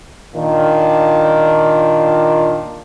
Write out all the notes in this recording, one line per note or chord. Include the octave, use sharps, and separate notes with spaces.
A#2 D#3 D4 F4